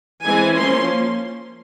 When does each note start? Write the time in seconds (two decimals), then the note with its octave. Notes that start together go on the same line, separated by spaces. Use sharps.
0.23 E3 G#3 C4 G#5
0.55 F3 A#3 C#4 C6